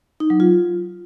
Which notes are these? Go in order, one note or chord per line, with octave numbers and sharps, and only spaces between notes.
D#4
F#3
F4